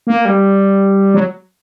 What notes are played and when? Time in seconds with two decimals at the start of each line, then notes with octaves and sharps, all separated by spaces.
0.07 A#3
0.25 G3
1.14 F#3